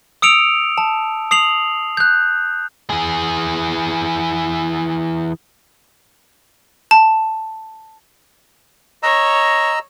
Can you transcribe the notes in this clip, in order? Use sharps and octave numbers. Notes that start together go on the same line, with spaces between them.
D#6 E6 C#7 D7 F7
A5
D#6 C7 F7 F#7
F#6 G6
E3 G#4
A5
C#5 D#5 A#5 E6